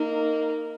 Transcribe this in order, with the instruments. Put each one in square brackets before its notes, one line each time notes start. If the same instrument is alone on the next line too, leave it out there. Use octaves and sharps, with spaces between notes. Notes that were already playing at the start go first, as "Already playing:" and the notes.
Already playing: [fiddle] A#3 [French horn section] D#4